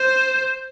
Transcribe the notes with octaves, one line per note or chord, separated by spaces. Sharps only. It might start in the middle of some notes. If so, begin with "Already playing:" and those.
Already playing: C5